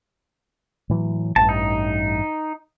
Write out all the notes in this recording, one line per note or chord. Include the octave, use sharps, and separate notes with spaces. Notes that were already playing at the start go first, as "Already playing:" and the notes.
A2 E3 F#3
A1 G2 A5
D#4